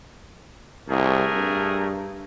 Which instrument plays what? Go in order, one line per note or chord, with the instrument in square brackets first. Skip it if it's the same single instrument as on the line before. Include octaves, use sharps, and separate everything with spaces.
[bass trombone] C2 [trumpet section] A3 G#4 A#4
[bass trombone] G2